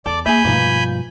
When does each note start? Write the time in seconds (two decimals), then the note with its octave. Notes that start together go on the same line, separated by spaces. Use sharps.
0.06 E2 A4 D5 D6
0.26 A#3 G#4 E5 G#5 B5 G6
0.45 G2 B2 F3 A3 A#3 D#4 B4